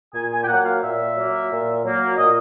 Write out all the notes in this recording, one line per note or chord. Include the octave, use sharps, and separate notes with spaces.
A#2 G#5
G#5
G5
F#3 A#3 F#5
F5
A#2 E5
F#3 A#3
A#2
F#3 A#3
A#2 D#5